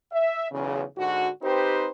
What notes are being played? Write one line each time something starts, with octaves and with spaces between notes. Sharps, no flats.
E5
B1 E2 C#3
G#2 D3 F#4
C4 D#4 G4 B4 C5